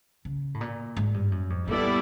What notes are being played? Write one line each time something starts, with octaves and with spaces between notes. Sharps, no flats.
C#3
A2
A#2
G#2
G2
F#2
F2
A#2 G3 B3 E4 A4 D5